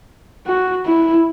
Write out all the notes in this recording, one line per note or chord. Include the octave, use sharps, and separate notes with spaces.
F#4
E4